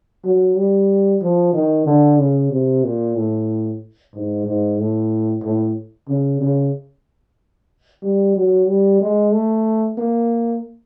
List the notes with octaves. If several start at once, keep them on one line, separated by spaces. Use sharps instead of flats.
F#3
G3
F3
D#3
D3
C#3
C3
A#2
A2
G#2
G#2
A2
A2
C#3
C#3
G3
F#3
G3
G#3
A3
A#3